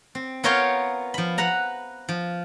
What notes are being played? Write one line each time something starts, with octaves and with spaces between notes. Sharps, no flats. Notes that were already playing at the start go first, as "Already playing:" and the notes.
C4
B3 F4 A#4 C#5 F5 G5
F3 B5
B4 F#5 A#5
F3